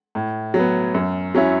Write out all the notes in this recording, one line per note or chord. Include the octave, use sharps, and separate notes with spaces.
A2
F#3
B3
F#2
F#3 C#4 E4